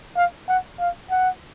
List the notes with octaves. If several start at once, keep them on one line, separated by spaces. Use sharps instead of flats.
F5
F#5
F5
F#5